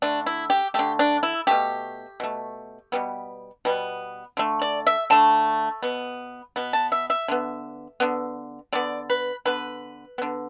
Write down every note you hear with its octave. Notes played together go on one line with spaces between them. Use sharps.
D3 A3 D4
E4
G4
D3 A3 G4
D4
E4
B2 A3 G4
B2 A3
B2 G3 B3
B2 G3 B3
D3 A3
D5
E5
D3 A3 A5
B2 B3
B2 B3
A5
E5
E5
D3 B3
D3 B3
D3 B3 D5
B4
D3 B3 B4
D3 B3